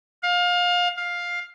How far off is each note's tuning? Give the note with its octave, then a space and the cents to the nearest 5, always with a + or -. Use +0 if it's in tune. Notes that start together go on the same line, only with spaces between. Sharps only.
F5 +25
F5 +10